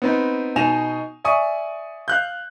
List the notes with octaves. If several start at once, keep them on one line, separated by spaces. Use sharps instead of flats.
B3 C4 D#4
B2 D#4 D#5 G#5 E7 F7
D5 E5 G#5 C#6 D#6
F5 F#6 G6